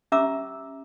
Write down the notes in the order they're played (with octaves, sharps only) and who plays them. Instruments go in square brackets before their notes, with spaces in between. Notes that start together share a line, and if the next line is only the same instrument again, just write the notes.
[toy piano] C#4 G4 E5 A#5 D6 E6